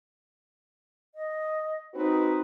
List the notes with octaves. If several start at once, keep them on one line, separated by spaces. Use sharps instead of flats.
D#5
C4 D#4 F#4 B4